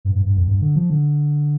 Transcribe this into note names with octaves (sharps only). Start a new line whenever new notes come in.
G2
G2
G2
F2
G2
D3
F3
D3